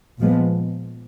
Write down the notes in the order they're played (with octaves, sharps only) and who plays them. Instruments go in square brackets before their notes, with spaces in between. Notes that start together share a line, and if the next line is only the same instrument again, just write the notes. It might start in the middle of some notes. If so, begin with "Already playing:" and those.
[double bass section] A#2 F3 G#3 B3